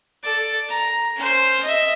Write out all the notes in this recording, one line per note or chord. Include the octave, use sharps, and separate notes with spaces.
A4 D5
A#5
C#4 C5
D#5 E5